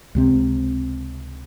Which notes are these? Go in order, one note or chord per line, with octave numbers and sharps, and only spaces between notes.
C#2 C3 C4